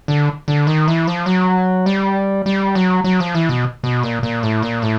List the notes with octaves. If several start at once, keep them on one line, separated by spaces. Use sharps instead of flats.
D3
D3
D#3
E3
F3
F#3
G3
G3
F#3
F#3
F3
E3
B2
B2
A#2
A#2
A2
A#2
A2